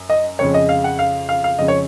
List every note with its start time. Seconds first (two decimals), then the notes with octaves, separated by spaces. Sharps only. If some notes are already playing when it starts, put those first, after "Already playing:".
Already playing: F#2
0.10 D#5
0.39 F2 C#3 G#3 C#5
0.54 D#5
0.69 F5
0.84 F#5
0.99 F5
1.29 F5
1.44 F5
1.59 F2 C#3 G#3 D#5
1.68 C#5